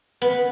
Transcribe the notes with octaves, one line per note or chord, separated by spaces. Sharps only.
B3